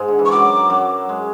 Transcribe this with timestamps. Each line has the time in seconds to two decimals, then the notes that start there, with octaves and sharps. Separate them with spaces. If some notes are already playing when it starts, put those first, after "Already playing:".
Already playing: G#2 G#3
0.08 D3
0.19 E3
0.26 C#6
0.31 F#2 F#3 D6
0.70 F#2 F#3
1.09 G#3